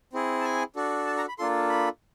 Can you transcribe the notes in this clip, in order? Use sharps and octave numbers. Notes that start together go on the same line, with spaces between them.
C4 E4 G#4
A5
G#5
D4 F#4 A4
A5
A#5
B5
A#3 D4 F4 A4 C6
B5